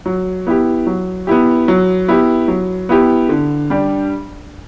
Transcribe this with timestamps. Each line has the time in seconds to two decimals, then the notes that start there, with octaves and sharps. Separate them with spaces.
0.06 F#3
0.47 B3 E4 G4
0.87 F#3
1.27 B3 E4 G4
1.68 F#3
2.08 B3 E4 G4
2.48 F#3
2.89 B3 E4 G4
3.29 D3
3.70 G3 D4 G4